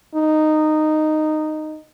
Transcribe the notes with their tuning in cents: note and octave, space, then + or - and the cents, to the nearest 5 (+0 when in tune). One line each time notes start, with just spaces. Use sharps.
D#4 -10